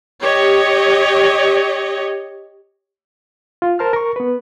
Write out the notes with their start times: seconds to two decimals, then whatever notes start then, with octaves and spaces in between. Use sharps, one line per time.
0.22 G4 C#5 D#5
3.62 F4
3.79 A#4 C5 A5 F6
3.93 A#4 C#6
4.16 B3 B4